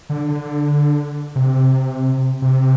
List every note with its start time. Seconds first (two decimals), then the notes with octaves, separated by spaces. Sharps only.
0.09 D3
0.28 D3
1.36 C3
2.42 C3